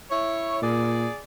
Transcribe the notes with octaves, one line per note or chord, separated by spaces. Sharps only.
E4 C#5
A#2 G#4 D5